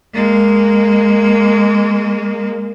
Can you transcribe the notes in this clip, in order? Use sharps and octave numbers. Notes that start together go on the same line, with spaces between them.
G#3 A#3